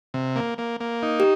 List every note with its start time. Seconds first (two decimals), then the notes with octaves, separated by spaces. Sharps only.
0.14 C3
0.36 A#3
0.58 A#3
0.80 A#3
1.03 D#4
1.20 G4